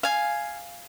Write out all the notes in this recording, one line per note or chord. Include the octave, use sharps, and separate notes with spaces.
F5 G#5